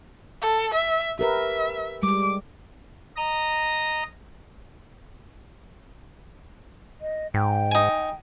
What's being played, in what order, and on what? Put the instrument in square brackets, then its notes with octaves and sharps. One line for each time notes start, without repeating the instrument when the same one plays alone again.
[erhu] A4
E5
[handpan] G4 A#4 B4 [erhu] E5
[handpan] G3 G#3 [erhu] D6
[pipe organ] D#5 A#5
[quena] D#5
[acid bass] G#2 [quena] G5
[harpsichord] D#4 G#5